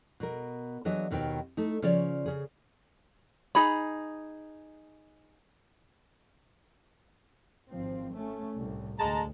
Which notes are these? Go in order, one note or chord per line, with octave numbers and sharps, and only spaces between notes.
B2 A#4
E3 F#3 D4 G#4 D#5 E5
D#2 B2 D#3 C4 G5
A3 D#4
C#3 F3 C#4 C#5 D5
C#3 G#4
D#4 G#4 B5
G#1 F3 C4
A3 C#4
C2 A2
D2 G#3 A5 A#5